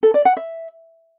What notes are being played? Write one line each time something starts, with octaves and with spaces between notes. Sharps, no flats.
A4
D5
F#5
E5